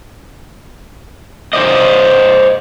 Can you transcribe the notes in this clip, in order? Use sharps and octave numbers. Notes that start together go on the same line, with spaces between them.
C5 D5 D#5